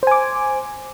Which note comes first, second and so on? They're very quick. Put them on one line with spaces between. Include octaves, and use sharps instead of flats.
C5 G#5 D6